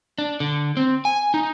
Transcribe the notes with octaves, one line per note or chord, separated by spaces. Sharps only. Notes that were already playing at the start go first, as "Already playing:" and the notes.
D4
D3
C4
G#5
D#4